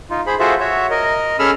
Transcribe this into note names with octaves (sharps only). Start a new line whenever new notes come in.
D#4 F4
G#4 C5 B5
F4 F#4 G#4 A4 C5 E5
F#4 C#5 E5
A#4 D#5
C#4 G#4 A4 B5 E6 F6